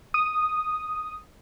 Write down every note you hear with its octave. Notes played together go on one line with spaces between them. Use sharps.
D#6